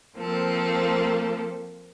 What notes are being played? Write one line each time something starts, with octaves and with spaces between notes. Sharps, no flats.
F3 A#3 C4 A4